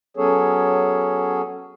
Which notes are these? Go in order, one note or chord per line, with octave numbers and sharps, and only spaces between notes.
F#3 B3 C#4 G#4 A4 C#5